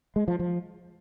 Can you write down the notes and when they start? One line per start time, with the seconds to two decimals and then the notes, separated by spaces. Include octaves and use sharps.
0.16 G#3
0.28 F3
0.39 F3